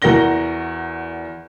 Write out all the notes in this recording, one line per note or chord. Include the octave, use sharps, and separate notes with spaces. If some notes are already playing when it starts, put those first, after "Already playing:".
E2 F#4 A#4 F#5 A#6 G7